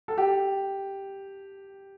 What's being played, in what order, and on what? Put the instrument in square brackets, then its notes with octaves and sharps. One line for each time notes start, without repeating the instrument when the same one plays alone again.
[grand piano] A4
G4